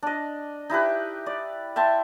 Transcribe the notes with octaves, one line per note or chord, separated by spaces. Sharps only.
D4 D#5
D#4 E4 G4 B4
D5
E5 G5 A5 C6